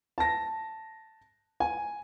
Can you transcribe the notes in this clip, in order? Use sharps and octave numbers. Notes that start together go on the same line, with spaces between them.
A5 A#6
G#5